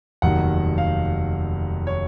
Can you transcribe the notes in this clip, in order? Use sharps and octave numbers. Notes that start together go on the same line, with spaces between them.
F1 D#2 D#3 F#3 F#5
F5
C#5